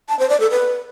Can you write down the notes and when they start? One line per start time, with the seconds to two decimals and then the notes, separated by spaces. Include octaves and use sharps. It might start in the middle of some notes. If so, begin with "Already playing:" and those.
0.09 A5
0.19 C5
0.30 D5
0.40 A4
0.51 B4